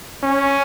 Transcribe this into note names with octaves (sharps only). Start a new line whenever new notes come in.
C#4